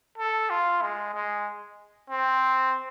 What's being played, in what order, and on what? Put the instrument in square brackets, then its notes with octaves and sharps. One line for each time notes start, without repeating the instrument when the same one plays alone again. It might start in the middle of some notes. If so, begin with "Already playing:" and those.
[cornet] A4
F4
G#3
G#3
C4